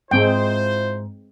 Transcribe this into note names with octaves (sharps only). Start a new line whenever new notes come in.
G#2 G#3 C4 E4 F4 C5 G5